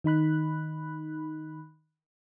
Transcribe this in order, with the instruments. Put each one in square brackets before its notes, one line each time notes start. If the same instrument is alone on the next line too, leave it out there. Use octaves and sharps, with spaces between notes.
[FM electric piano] D#3 D#4 B5 F#6